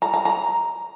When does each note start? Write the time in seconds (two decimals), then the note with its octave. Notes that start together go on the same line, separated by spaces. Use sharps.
0.02 A#5
0.14 A#5
0.25 A#5